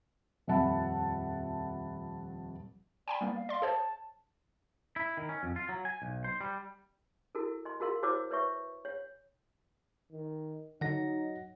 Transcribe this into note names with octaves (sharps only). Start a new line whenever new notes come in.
D#1 F2 E5 F#5 A5 B5
D5 G5 G#5 B5
G3 A#3 B3
F5
D5 C6
G#4 C5 C#5 A5
E4
D#3
C#4
F2
F4
F#3
G#5
B1
C5
G3
E4 F#4 A4 A#4
D#5 C6
F4 F#4 G#4 A#4 F5 C6
E4 F#4 C5 C#5 D6 E6
B4 C#5 E5 C#6
C#5
D#3
D3 F#3 D#4 F#5 A#6